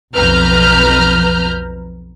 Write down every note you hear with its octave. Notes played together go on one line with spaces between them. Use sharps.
B1 F2 B4 A#5 F6 G6